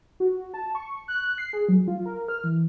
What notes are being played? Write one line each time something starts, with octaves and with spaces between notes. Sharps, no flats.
F#4
A5
C#6
F#6
C7
G#4
F#3
F4
A#4
F6
E3